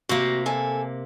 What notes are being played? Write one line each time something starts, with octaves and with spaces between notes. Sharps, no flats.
C3 A#3 F#4
A4 G#5